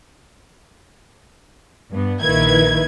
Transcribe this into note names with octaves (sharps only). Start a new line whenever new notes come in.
G2 B3
A#1 D#3 A#3 E4 B4 G#6